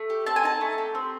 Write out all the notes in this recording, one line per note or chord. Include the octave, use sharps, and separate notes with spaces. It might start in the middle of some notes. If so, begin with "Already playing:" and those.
Already playing: A3
G4
C4 A5
G#5
D#4 A5
A3
G4
C4